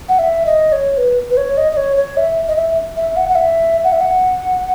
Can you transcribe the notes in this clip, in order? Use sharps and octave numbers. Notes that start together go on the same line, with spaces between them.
F#5
E5
D#5
C#5
B4
B4
C#5
D#5
D#5
C#5
C#5
E5
D#5
E5
E5
F#5
F#5
E5
F#5
E5
F#5